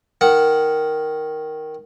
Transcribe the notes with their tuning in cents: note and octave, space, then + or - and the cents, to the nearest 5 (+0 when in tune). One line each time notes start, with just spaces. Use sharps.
D#3 +0 F#5 +0